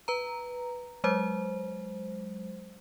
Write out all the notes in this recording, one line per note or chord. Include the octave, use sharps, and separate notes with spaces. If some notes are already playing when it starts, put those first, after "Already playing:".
B4 A#5
F#3 G#3 C5